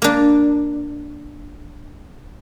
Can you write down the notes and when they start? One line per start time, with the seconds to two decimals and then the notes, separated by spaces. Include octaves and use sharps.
0.02 A#3 D4